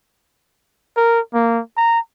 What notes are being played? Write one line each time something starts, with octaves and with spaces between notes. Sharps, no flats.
A#4
A#3
A#5